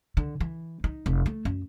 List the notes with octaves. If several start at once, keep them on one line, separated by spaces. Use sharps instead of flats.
D3
E3
D#4
F1
A3
F#2